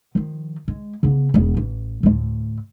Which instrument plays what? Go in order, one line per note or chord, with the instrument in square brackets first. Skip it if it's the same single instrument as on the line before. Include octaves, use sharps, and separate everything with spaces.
[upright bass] D#3 F3
G#3
C#3 B3
E1 B3
A1
D2 A2